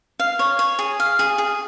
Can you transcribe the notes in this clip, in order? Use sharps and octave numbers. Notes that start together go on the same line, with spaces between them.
F5
C#5
C#5
G#4
F5
G#4
G#4